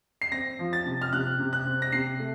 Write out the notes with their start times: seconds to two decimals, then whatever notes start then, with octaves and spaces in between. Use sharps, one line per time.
0.22 C7
0.32 C4 A#6
0.59 F3
0.73 A6
0.85 C3
1.01 F6
1.13 C3 F#6
1.39 C3
1.53 F#6
1.66 C4
1.82 A#6
1.92 C3 C7
2.19 A3